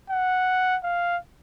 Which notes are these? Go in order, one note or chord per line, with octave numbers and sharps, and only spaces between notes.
F#5
F5